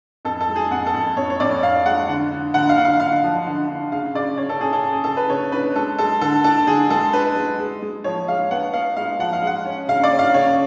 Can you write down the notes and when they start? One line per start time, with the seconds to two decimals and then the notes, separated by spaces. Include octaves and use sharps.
0.25 F2 A4
0.41 A4
0.49 G#3
0.56 G#4
0.71 F2 F#5
0.87 A4
0.94 F2
1.17 F2 C#5
1.30 C#5
1.40 F2 D5
1.63 F2 F5
1.86 G#3 F#5
2.08 D3
2.32 D3
2.54 D3 F#5
2.69 F5
2.77 D3
2.85 F5
3.00 D3 F5
3.24 F3
3.47 D3
3.69 D3
3.92 C#3 F5
4.15 C#3 D5
4.38 C#3 C#5
4.49 A4
4.61 C#3 G#4
4.73 A4
4.83 C#3
4.92 G#4
5.04 C#3 A4
5.17 B4
5.29 C#3 C#5
5.52 D4 B4
5.76 G#3 A4
5.98 G#3 A4
6.21 D3 A4
6.44 D4 A4
6.67 D3 G#4
6.90 G#3 A4
7.13 D4 B4
7.36 G#3
7.60 G#3
7.82 G#3
8.04 F3 C#5
8.28 G#3 F5
8.51 B3 F#5
8.73 B3 F5
8.96 G#3 F5
9.19 F3 F#5
9.33 F5
9.42 G#3 F#5
9.66 C#4
9.88 C#3 F5
10.04 D5
10.12 C#4
10.19 F5
10.34 C#3 C#5